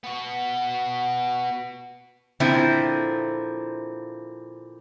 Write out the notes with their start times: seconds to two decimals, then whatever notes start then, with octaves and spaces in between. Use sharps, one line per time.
0.04 B3 F#4
2.40 A#2 D3 F3 C4 E4